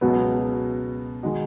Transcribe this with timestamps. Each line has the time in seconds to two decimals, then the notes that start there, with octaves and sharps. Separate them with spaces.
0.01 C#2 B2 F#3 B3
1.23 D#3 G#3 D#4 F#4